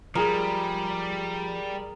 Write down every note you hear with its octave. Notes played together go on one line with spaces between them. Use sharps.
F3 G3 G#4 A#4